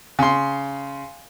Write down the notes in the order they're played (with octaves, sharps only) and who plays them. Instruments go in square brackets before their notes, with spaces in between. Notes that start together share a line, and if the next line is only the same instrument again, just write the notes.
[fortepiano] C#3 C6